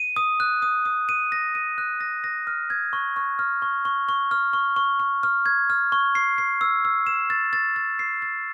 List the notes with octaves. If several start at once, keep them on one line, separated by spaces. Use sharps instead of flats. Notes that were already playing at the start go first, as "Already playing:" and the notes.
Already playing: D#7
D#6
F#6
D#6
D#6
D#7
A#6
D#7
F#6
A#6
A#6
F6
G#6
C#6
C#6
F6
C#6
C#6
C#6
F6
C#6
C#6
C#6
F6
G#6
F6
C#6
C7
C7
E6
E6
E7
A6
A6
A6
C7
A6